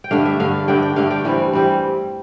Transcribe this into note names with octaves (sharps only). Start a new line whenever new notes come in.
G5
G2 D3 A3 D4 F5
E5
G2 D3 A3 D4 F5
G2 D3 A3 D4 G5
G5
G2 D3 A3 D4 F5
G5
E3 G3 C4
E3 G3 C4